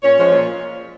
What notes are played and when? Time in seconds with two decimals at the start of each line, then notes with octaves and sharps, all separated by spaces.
0.03 A#2 C#4 C#5
0.18 F3 G#3 C#4
0.32 A#2